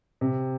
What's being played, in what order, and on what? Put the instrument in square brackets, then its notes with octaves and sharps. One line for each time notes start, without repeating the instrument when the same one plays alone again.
[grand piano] C3